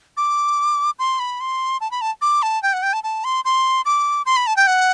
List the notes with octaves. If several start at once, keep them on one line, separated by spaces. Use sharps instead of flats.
D6
C6
B5
C6
A5
B5
A5
D6
A5
G5
F#5
G5
A5
A5
C6
C6
D6
C6
B5
A5
G5
F#5